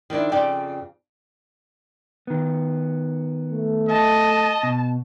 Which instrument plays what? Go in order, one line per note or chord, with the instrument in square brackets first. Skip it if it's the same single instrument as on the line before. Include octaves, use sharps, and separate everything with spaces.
[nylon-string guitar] D#3 F3 D4 E4
F2 C#3 F3 D5 G5 A5
[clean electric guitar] D#3 B3
[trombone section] A3
[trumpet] D#5 [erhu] A5
[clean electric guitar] B2